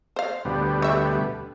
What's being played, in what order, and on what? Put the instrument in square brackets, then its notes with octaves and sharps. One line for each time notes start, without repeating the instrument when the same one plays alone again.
[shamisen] C5 F5
[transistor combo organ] D2 B2 G3
[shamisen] A3 E5